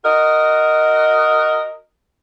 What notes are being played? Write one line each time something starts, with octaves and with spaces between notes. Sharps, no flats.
F#4 A#4 D#5